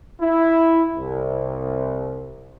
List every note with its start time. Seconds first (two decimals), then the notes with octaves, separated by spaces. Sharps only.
0.21 E4
0.96 C2